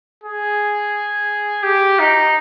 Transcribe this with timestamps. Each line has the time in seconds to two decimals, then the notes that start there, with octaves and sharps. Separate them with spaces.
0.24 G#4
1.63 G4
1.99 D#4